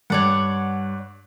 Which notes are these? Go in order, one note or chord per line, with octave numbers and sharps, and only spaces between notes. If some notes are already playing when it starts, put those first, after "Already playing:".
G2 C#5 D5 F#5